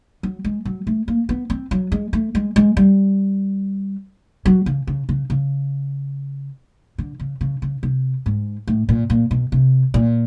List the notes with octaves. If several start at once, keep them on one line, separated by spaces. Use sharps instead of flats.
F#3
G#3
F#3
A3
A#3
B3
C4
F#3
G#3
A3
G#3
G#3
G3
F#3
C#3
C#3
C#3
C#3
D3
C#3
C#3
C#3
C3
G#2
A2
A#2
A#2
B2
C3
A#2